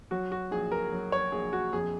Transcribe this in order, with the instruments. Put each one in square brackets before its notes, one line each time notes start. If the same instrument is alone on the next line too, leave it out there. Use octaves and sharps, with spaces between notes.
[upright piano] F#3 F#4
F#4
A#1 G#4
A#4
F#3
C#5
A#1 G#4
F#4
F2 G#4